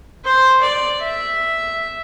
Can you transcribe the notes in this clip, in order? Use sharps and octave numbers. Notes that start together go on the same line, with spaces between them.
C5
D5
E5